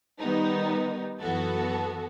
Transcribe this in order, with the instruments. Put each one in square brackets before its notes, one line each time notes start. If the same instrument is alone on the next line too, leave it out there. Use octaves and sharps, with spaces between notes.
[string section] D#3 G3 B3 D#4
F#2 E3 B3 F#4 A4